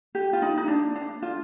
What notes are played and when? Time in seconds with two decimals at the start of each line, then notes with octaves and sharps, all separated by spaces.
0.15 G4
0.33 F4
0.42 D#4
0.57 D#4
0.68 D4
0.96 D4
1.22 F4